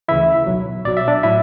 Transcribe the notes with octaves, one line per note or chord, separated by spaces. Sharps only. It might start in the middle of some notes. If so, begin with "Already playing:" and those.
D2 C#3 E3 E4 E5
B1 B2 F#3
B1 B2 F#3 D5
E5
D4 D5
A2 F#3 E4 E5